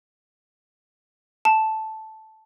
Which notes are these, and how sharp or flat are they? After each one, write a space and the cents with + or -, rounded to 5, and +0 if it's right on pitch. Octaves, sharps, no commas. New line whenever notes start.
A5 -5